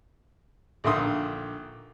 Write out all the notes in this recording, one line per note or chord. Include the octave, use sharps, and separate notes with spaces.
A#1 D3 D#3 E5 C6 D#6